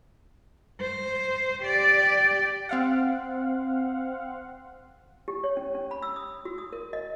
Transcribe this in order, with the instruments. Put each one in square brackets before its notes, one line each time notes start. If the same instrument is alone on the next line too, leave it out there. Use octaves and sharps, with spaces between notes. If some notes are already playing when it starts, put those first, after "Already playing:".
[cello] C5
G4 D5
[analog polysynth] C4 F5 F#5
[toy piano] G4
C#5
C#4
C#4
B5
E6
D#6
F#4
D#6
A#4
D#5